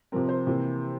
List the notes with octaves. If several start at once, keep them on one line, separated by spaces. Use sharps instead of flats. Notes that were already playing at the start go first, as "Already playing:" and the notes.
C3 F3 C4 A#4
C5
C3 E3 A#3